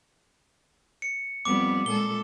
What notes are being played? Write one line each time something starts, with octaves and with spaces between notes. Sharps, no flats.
C#7
F2 G3 B3 D6
A#2 G#3 A4 G7